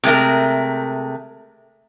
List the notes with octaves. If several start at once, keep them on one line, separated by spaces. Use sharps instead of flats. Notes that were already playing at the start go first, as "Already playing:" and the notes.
C3 G#3 A3 A#4